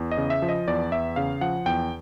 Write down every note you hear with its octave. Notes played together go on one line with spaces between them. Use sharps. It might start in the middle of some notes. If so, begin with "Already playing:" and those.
Already playing: E2
D#5
C#3
E5
F3
D#5
E2 D5
E2 E5
C#3 F5
F3 F#5
E2 G5